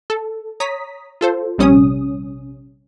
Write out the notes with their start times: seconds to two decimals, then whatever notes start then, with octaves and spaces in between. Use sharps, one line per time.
0.10 A4
0.60 C#5 A#5 D#6 B6
1.21 F4 A4 C5
1.58 A#1 C3 G3 C#4 D#6